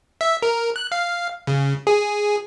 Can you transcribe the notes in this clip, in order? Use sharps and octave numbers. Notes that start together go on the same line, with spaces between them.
E5
A#4
F#6
F5
C#3
G#4